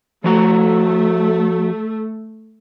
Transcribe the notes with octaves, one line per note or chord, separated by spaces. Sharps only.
F3 A3 F#4 A#5